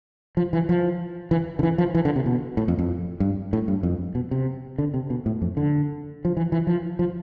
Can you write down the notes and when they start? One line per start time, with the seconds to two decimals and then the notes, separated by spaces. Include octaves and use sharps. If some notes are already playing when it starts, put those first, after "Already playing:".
0.37 F3
0.53 E3
0.69 F3
1.31 E3
1.59 D3
1.63 E3
1.78 F3
1.95 E3
2.05 D3
2.16 C3
2.26 B2
2.57 A2
2.68 F2
2.79 F2
3.20 G2
3.53 A2
3.68 G2
3.83 F2
4.15 B2
4.31 C3
4.78 D3
4.94 C3
5.10 B2
5.26 A2
5.42 F2
5.57 D3
6.25 F3
6.37 E3
6.52 E3
6.67 F3
6.99 F3